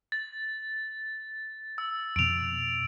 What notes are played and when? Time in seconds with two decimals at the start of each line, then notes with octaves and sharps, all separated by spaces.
0.12 A6
1.78 E6
2.16 F2 B2 D7 F7